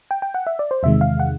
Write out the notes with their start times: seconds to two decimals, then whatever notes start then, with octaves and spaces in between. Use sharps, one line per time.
0.11 G5
0.22 G5
0.34 F#5
0.47 E5
0.59 D5
0.71 C5
0.83 E2 C3 D#3 G#3 E5
1.01 F5
1.20 F#5